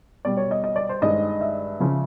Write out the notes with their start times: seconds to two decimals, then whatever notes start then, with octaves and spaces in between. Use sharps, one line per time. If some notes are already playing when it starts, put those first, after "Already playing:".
0.25 B2 G3 D5
0.37 C#5
0.51 D#5
0.64 D#5
0.76 D5
0.89 C5
1.02 G2 D#3 G#3 D#5
1.41 E5
1.80 C#3 F3